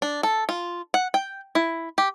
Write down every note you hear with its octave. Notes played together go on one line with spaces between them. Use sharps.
D4
A4
F4
F#5
G5
E4
G4